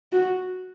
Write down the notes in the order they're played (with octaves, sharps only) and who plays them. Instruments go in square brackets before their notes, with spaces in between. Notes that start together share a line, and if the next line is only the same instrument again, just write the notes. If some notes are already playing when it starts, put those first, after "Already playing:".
[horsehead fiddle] F#4